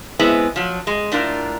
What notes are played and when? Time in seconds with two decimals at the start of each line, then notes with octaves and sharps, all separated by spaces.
0.19 G#3 B3 C4 E4 G#4
0.56 F3 F#3
0.87 G#3
1.12 A2 D4 F4 A#4